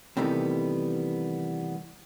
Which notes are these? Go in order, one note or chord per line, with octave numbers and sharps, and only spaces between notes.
C3 D#3 E3 G3 A3 B3